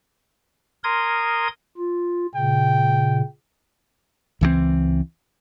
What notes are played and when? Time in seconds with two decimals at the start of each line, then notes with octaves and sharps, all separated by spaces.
0.84 A#4 C6 D#6 G#6
1.78 F4
2.35 A#2 C#3 G5
4.41 C#2 E3 F3 C4